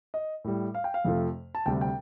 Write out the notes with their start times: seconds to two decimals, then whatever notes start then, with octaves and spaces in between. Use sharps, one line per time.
0.14 D#5
0.44 A2 G3
0.74 F5
0.84 G5
0.94 F5
1.05 F2 C3 F3 A3
1.55 A5
1.66 D2 C3 G3 G5
1.81 G5